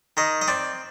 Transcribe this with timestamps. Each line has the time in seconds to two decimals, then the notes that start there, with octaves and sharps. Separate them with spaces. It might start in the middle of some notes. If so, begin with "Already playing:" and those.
0.17 D#3 D#5
0.41 D#5
0.48 C4 D5